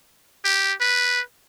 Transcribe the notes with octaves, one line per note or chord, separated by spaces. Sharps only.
G4
B4